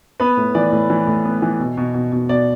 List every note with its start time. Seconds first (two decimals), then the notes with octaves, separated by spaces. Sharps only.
0.20 B3 B4
0.37 A2
0.55 E3 D5
0.72 A2
0.90 E3
1.07 A2
1.25 B3
1.42 E3
1.60 B2
1.77 B2
1.94 B2
2.12 B2
2.29 B2 D5